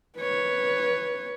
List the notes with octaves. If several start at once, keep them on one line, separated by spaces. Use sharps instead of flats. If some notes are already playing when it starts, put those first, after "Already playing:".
B4 C#5